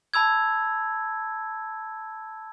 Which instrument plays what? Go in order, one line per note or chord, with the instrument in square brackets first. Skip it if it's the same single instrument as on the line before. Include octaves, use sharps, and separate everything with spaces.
[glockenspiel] A5 B5 E6 G#6